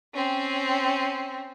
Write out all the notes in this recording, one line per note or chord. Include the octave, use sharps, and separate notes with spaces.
C4 C#4